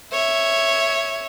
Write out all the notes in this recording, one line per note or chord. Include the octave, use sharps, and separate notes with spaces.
C#5 E5